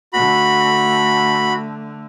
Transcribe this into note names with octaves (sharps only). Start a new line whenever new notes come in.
D3 A3 F#4 B5